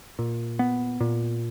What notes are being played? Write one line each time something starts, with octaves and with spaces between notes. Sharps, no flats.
A#2
B3
A#2